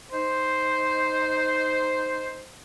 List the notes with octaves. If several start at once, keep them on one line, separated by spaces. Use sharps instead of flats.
D#4 C5